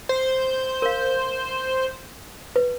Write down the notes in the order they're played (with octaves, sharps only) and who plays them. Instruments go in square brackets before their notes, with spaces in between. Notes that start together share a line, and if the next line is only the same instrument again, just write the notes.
[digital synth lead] C5
[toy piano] A#4 F5
B4